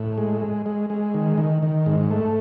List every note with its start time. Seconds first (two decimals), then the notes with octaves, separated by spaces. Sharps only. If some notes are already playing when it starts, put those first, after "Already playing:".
Already playing: A2
0.18 G#3
0.41 G#3
0.66 G#3
0.90 G#3
1.14 D#3
1.38 D#3
1.62 D#3
1.86 G#2
2.11 A3